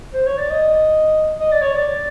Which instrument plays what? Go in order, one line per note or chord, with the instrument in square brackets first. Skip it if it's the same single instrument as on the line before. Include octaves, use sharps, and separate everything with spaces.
[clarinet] C5
C#5
D5
D#5
D#5
D5
C#5
D5